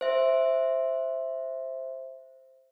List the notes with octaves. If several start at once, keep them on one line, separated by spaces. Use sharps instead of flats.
C5 E5